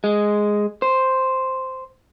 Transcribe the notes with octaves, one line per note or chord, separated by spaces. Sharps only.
G#3
C5